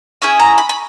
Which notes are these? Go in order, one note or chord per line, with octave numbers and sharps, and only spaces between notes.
C#4 E4 G#4 E5
A#5
B5
B5